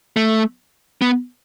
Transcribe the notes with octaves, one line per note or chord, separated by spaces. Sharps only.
A3
B3